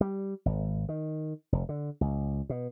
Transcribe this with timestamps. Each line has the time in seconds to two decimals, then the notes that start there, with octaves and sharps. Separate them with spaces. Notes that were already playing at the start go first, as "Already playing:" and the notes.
0.01 G3
0.46 G#1
0.89 D#3
1.52 F1
1.69 D3
2.01 C#2
2.49 B2